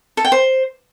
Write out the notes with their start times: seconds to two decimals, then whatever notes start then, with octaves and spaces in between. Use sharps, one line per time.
0.17 A4
0.25 G5
0.32 C5